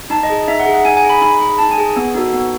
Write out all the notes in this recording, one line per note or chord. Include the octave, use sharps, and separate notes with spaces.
D#4 A5
D#5
G#4
D#4 E5
F#5
G#4
F#5
D#4 G#5
G#5
G#4
B5
D#4 B5
G#4
D#4 A5
G#5
G#4
B3
D#4 F#4 A4
B3